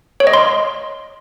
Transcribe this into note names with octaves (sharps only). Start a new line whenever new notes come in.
C#5
D#5
C6